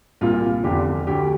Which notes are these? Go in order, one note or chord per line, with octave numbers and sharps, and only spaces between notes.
C2 A#2 F4
F1 E2 D3 G4
D2 D3 G4